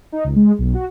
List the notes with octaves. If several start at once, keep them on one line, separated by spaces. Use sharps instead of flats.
D#4
C#2
G#3
B1
F#4